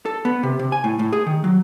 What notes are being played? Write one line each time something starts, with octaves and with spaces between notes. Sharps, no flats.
A4
B3
C3
C3
G#5
A2
A2
G#4
D#3
F#3